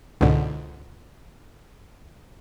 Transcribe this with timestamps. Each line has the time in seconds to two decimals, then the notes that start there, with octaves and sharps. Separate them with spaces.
0.21 C#2 G#2 B2 D3